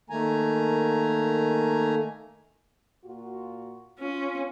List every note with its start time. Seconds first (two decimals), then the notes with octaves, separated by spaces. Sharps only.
0.10 D#3 A3 A#3 G#5 A#5
3.05 A#2 F4 F#4
3.99 C#4 F4